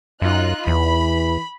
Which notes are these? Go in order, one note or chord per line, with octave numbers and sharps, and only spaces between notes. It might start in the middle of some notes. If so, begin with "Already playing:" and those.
F#2 D#4 F4 F#6
E2 E3 B5